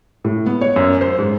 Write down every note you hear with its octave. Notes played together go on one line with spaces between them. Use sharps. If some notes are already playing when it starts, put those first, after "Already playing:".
A2
B3
C#5
F#2
C5
G#2